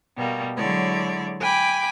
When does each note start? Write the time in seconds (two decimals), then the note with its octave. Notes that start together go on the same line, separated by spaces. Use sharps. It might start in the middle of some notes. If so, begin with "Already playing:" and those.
0.16 B2 G3 A#3
0.57 D3 F#3 G#3 E4 C#5 D5
1.40 G5 G#5 B5 D6